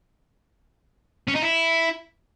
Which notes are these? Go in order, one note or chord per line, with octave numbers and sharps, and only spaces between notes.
C#4
D#4
E4